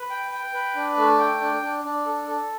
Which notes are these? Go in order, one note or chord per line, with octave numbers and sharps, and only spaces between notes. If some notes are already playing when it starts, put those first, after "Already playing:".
Already playing: B4
G5
G5
B4
D4
A3
G5
D4
D4
D4
A4
A4